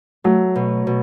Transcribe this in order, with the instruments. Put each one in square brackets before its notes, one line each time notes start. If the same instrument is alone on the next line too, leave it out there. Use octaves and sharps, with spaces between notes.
[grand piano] F#3 [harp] A3
[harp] B2
B2